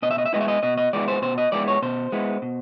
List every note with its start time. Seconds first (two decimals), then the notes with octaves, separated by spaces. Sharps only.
0.02 B2 D#5
0.11 E5
0.18 D#5
0.26 E5
0.33 G#3 B3 E4 D#5
0.41 E5
0.48 D#5
0.63 B2 D#5
0.78 D#5
0.93 G#3 B3 E4 D5
1.08 C5
1.22 B2 C5
1.38 D#5
1.52 G#3 B3 E4 D5
1.68 C#5
1.82 B2 C5
2.12 G#3 B3 E4
2.42 B2